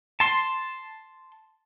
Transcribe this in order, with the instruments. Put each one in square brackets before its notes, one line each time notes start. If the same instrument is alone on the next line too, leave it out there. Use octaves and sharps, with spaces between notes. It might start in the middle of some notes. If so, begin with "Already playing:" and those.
[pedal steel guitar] A5 C6